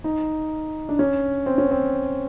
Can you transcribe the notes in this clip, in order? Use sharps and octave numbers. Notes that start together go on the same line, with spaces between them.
D#4
D4
C#4
C4
C#4
C4